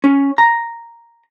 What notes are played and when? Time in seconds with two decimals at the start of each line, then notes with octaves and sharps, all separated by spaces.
0.04 C#4
0.38 A#5